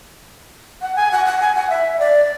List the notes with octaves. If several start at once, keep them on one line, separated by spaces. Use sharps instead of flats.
F#5
G#5
F#5
F#5
G#5
F#5
E5
D5